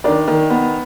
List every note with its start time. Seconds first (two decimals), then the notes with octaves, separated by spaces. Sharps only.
0.04 D#3 D4 D5
0.28 D#3
0.50 B3